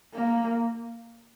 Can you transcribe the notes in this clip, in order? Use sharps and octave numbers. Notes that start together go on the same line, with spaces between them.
A#3